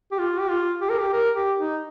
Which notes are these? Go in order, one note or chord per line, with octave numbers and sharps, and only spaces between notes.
G4
F4
G4
F4
G4
A#4
G4
A#4
G4
D#4